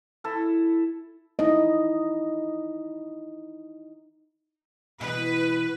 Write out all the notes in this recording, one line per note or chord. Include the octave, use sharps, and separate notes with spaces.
E4 A4 E5
D#4 E4 D#5
B2 E3 B4